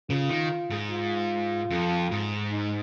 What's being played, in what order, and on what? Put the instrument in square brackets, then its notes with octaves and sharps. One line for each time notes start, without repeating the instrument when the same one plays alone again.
[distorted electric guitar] C#3 [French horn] F4
[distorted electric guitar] D#3
G#2
[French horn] F4
[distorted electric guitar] F2
G#2
[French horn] D#4